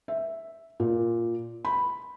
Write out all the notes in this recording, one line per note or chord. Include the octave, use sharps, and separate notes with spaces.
E5
A#2
B5